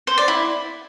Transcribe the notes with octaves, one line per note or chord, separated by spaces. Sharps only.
C5
D5
E4